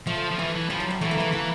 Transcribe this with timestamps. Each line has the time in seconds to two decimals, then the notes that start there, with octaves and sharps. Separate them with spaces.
0.07 F3 A3
0.31 F3
0.38 E3 A3
0.55 E3
0.69 F3 G3
0.80 F#3
0.90 G3
1.01 E3 A3
1.11 A#3
1.17 E3 A3
1.32 E3 A#3